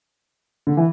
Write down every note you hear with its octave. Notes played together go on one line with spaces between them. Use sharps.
D3
E3